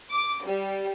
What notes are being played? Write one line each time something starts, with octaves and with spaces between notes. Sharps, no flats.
D6
G3